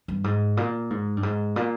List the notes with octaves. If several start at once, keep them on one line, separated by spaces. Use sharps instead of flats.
G2
G#2
A#2
G#2
G2
G#2
A#2